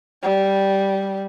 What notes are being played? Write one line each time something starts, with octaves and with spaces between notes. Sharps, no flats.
G3